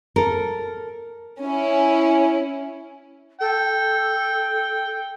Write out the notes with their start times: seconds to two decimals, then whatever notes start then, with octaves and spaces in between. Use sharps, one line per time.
0.16 A4 A#4
1.42 C#4 E4
3.41 A4 G5